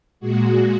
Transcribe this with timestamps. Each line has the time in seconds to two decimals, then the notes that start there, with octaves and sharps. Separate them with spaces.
0.20 A#2 G#3 F#4